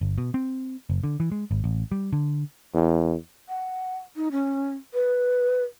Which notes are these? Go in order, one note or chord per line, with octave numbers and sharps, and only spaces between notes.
G1
B2
C4
F#1
D3
E3
G#3
G#1
A1
G3
D3
E2
F#5
D#4
C#4
B4